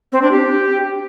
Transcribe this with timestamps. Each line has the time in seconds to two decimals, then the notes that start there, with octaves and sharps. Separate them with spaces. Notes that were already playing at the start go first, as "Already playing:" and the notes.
0.12 C4
0.22 D4
0.31 G4